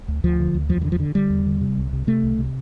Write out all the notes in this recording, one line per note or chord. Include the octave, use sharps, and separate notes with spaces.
D2
D2 F3
D3
D2
E2 F3
E3
D3
F3
D3
D3 G3
E2
D3
C3
C2
C3
C3 A3
C2
C3